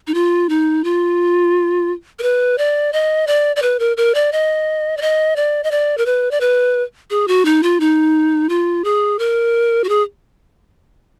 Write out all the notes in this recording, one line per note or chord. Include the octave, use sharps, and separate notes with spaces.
D#4
F4
D#4
F4
A#4
B4
D5
D#5
D5
D5
B4
A#4
A#4
D5
D#5
D5
D#5
D5
D#5
D5
A#4
B4
D5
B4
G#4
F#4
D#4
F4
D#4
F4
G#4
A#4
F#4
G#4